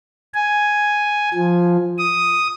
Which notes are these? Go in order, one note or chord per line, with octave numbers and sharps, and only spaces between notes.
G#5
F3
D#6